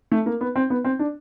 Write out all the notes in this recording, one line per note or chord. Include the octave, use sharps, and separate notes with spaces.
A3
A#3
B3
C4
B3
C4
D4